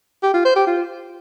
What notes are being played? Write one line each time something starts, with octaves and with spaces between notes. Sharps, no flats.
G4
F4
C5
G4
F4